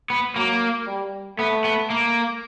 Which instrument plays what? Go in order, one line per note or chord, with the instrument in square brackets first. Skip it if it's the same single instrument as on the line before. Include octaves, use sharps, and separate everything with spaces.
[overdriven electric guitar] B3
[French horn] F#3 [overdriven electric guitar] A#3
[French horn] G3
[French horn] A3 [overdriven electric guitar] B3
[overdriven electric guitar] B3
A#3